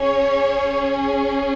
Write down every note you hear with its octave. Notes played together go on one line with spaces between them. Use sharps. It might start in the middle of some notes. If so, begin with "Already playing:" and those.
Already playing: C#4 G#4 C#5